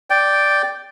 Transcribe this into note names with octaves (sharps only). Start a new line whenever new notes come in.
D5 G5